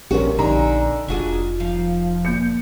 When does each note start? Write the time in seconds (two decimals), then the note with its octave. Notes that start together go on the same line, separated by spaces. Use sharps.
0.11 A#1 C3 G3 C#4 F#4 A#4
0.39 A#1 D3 C4 D#4 D5 G#5 A#5
1.09 F1 D4 F4 F#4 G#4
1.60 F3
2.25 A#2 G6 C#7